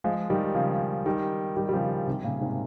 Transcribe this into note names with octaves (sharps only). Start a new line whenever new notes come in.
F3 G#3
D#3 G3
C#3 F3
D#3 G3
D#3 G3
G3
C#3 F3
C3 D#3
A#2 C#3
G#2 C3